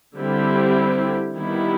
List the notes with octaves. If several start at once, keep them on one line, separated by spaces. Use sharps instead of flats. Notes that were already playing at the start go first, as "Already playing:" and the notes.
D3 G3 C4 E4 G4
D#3 G3 B3 E4